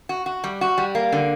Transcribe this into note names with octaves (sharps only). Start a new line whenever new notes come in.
F#4
F#4
G3
F#4
G3
A#3
D3